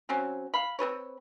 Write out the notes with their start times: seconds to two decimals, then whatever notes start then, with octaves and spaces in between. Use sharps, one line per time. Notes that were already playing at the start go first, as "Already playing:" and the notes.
0.09 F#3 C4 C#4
0.54 F5 B5
0.79 C4 A4 B4 C#5